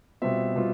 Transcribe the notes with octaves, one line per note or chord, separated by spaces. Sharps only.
B2 G3 C4 F4 E5
B2 G3 C4 F4